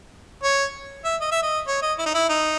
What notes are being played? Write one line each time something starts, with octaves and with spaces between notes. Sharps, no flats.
C#5
E5
D#5
E5
D#5
C#5
D#5
E4
D#4
E4
D#4